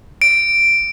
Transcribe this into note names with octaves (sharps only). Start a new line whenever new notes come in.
D7